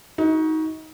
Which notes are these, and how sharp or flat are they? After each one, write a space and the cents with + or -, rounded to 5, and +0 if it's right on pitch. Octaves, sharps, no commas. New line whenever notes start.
D#4 +25 F#4 +0